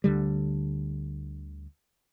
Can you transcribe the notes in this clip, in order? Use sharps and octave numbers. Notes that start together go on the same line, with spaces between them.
D2 D3 G3